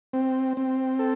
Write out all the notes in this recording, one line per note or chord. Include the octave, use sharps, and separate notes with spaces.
C4
C4
A4